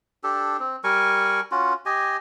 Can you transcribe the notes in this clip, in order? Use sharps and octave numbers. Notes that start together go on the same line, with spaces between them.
D4 G4 A4
C4
G3 A#4 G#5 C#6
C#4 F4 F#4
G4 D#5 G#5